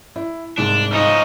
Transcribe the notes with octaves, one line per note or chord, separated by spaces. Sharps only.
E4
C2 G#2 D4
F3 C#4 D#4